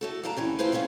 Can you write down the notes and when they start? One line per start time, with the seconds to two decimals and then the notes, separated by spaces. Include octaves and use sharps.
0.01 A3 F#4 A4
0.23 G3 A#3 D4 A5 A#5
0.37 D2 E3 C#4 G4
0.59 A#3 E4 F4 G4 B4 C5
0.72 E3 G3 C#4 D4 F4